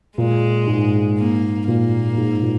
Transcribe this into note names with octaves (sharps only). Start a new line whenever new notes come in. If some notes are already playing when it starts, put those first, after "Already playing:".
A#2 G#3
G#2
A#3
A#2 A#3
G#2
A#2